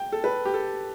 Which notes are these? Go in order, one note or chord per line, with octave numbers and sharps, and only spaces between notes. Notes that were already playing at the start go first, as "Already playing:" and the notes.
Already playing: G5
A4
B4
G4
A4